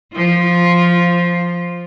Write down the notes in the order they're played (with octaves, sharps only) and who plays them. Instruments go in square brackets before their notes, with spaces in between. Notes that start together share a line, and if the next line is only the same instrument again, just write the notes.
[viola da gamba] F3 F4